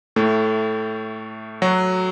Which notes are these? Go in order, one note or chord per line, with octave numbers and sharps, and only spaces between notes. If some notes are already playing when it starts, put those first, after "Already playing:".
A2 A3
F#3 F#4